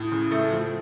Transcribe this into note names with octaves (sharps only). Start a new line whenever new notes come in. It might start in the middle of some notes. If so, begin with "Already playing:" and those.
Already playing: A2 D#6
C#3
A3
F3